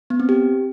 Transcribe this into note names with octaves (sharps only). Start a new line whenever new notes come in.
B3
C4
G4